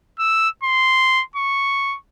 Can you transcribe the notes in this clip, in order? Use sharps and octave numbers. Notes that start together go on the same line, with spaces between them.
E6
C6
C#6